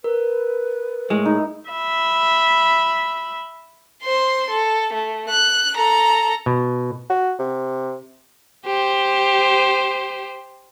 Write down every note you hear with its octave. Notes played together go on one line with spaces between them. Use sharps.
A#4 B4
A2 G#3
D#4 E4
E5 B5
C5 C6
A4
A3
F#6
A4 A#5
B2
F#4
C3
G4 C5